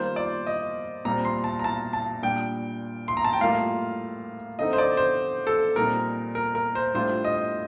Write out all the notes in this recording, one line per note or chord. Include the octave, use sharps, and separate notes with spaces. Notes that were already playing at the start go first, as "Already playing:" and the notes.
Already playing: D#3 G3 A#3 F4 C5
D5
D#5
A#2 G3 C4 A#5
C6
A5
A#5
A5
A5
A#2 G3 D4 G5
C6
A#5
A5
G5
A2 G3 A#3 F4 F5
D3 A3 C4 D#4 D#5
C5
D5
C5
A4
A#2 G3 C4 D#4 A#4
A#4
A#4
C5
A2 G3 D4 F4 C5
D#5